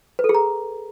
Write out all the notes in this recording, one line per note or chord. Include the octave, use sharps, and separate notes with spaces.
B4
A4
G#4
A#5